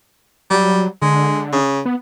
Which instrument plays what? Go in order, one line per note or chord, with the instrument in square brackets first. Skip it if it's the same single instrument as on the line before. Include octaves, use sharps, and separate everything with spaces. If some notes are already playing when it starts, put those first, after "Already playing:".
[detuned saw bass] F#3 [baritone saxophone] G3
[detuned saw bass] D3 [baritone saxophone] G#3
[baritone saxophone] C#3
[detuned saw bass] B3